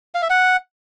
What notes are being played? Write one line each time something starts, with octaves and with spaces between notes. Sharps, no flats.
F5
E5
F#5